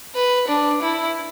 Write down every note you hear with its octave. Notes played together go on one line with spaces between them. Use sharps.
B4
D4
E4